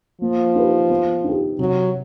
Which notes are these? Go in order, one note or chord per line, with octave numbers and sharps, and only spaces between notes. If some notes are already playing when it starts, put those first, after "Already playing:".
F3 A#3
D#4 G4 B4
B3
D#4 G4
C3 F#3